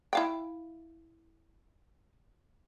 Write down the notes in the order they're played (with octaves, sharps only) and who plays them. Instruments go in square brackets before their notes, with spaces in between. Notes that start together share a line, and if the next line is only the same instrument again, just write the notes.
[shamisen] E4 F5 G5